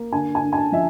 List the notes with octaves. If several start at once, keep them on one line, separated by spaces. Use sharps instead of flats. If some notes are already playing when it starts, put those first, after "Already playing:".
Already playing: A#3
D3 G#5
G#5
D3
G#5
A5
F3 E5